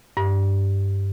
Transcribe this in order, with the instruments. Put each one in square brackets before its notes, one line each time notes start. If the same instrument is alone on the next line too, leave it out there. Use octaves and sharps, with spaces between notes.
[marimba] G2